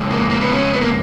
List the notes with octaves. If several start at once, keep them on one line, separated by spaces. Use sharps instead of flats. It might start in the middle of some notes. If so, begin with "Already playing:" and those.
Already playing: F2 C#3 G#3
A#3
A#3
B3
C#4
B3
A#3